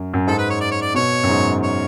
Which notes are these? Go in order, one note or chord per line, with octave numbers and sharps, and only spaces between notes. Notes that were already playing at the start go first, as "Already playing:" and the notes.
Already playing: F#2
F#2
G#2 A4
B4
C#5
D5
C#5
D5
B2 C#5
F#2
G#2
C#5